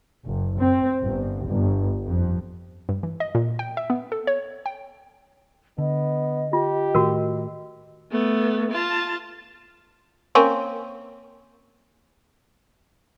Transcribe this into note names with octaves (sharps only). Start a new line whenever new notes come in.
F#1
C4
G1
G1
F2
G2
E3
D#5
A#2
G5
E5
B3
A4
C#5
G5
D3 B3 D#5
F4 G4
A2 D#3 A3 F#4 A#4
A3 B3
F4 A5
A#3 C4 C#4